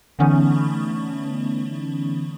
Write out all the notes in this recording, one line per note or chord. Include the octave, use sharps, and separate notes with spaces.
D3 E3 A3 B3 C#4 D#4